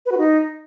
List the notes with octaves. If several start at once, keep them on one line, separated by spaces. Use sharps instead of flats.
B4
F#4
D#4